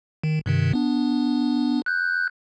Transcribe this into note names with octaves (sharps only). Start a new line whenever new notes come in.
D#3
G2 C3 D#3
B3 D4
F#6 G6